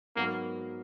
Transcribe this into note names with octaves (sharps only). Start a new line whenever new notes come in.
G#2 F#3 A#3 B3 F#4 A#4